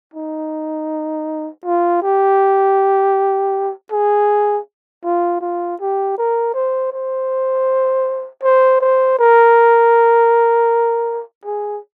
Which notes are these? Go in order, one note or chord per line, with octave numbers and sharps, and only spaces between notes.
D#4
F4
G4
G#4
F4
F4
G4
A#4
C5
C5
C5
C5
A#4
G#4